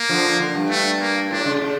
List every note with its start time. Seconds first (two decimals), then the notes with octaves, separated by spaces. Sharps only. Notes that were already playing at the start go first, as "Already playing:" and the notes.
Already playing: A#3
0.09 D3 F3
0.39 D3
0.55 G2
0.70 A3
1.00 A#3
1.31 A2 D4
1.46 C#3
1.61 C#3